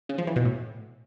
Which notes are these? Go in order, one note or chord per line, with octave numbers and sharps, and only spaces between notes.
C#3
F3
E3
B2
A2